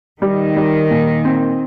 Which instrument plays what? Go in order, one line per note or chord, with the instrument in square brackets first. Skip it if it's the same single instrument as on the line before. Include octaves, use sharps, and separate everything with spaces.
[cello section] D#3 [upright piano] G3
[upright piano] G3
A#2
C4